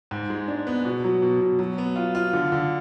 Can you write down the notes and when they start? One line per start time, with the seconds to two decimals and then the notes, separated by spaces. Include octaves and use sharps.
0.11 G#2
0.30 G#3
0.48 D4
0.67 B3
0.85 B2
1.04 F#3
1.22 B2
1.41 B2
1.59 F#3
1.78 B3
1.96 F4
2.15 F4
2.33 D3
2.52 D3